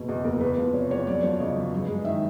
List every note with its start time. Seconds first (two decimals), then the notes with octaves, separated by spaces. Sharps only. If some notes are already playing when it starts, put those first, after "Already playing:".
Already playing: F#1 B2
0.08 E2 D#5
0.24 F#1 A#4
0.41 E2 B4
0.58 F3
0.74 C3 C#5
0.90 E2 C#5
1.07 F#2 D5
1.23 F3 C#5
1.40 C#3 D#5
1.57 F#2
1.72 G2
1.88 G#3
1.99 D#5
2.05 D#3 E5